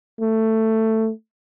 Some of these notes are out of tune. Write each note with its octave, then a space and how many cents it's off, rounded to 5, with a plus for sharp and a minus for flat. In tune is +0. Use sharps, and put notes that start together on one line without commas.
A3 +10